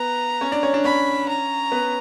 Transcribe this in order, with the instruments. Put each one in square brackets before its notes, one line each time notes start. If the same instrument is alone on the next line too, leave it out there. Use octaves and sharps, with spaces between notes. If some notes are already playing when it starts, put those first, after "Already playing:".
Already playing: [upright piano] B3 B4 [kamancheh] A#5
[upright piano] C#4 C#5
D4 D5
C#4 C#5
D4 D5
[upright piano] C#4 C#5 [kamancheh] B5
[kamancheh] A#5
[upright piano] B3 B4